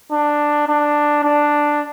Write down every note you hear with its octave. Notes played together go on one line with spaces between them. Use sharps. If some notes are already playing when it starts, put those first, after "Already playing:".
D4
D4
D4